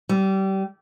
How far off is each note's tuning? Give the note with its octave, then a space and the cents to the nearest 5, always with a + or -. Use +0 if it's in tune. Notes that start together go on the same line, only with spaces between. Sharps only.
G3 -25